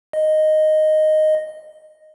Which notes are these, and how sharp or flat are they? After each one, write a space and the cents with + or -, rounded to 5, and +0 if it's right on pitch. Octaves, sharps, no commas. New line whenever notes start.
D#5 -5